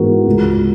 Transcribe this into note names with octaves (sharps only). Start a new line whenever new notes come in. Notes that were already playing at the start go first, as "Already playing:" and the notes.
Already playing: G#2 E3 B3 F#4 A#4
C#2 C#3 G#3